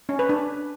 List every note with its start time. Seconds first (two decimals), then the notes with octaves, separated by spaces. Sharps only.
0.09 C#4
0.19 B4
0.29 D4